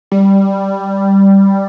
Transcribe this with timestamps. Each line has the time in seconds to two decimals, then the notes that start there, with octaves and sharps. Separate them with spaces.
0.11 G3